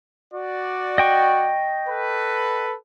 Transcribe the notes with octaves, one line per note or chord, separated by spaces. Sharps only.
F#4 D5
D#5 G5 C#6
A4 B4